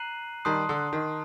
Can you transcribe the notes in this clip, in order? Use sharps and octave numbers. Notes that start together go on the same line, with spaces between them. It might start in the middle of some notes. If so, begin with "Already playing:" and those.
Already playing: A#5 F#6 C7 D#7 F#7
D#3 G3 A5 C6 D#6 F#6 C7
D3
D#3